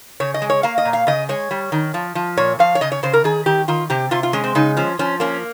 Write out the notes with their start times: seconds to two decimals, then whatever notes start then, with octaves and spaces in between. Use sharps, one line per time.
0.20 C#3 C#5
0.34 D#5
0.42 G#3
0.50 C#5
0.63 A#3 F5
0.78 D#5
0.85 A#2
0.93 F5
1.07 C#3 D#5
1.29 G#3 C#5
1.51 G3
1.72 D#3
1.94 F3
2.15 F3
2.37 A#2 C#5
2.59 F3 F5
2.75 C#5
2.81 C#3 D#5
2.92 C#5
3.03 C#3 C5
3.13 A#4
3.24 D#3 G#4
3.46 D#3 G4
3.68 D#3 F4
3.90 C3 G4
4.11 C3 F4
4.23 F4
4.33 G#3 C#4
4.44 C4
4.55 C#3 D#4
4.77 F3 C#4
4.99 F3 C#4
5.20 A#3 C#4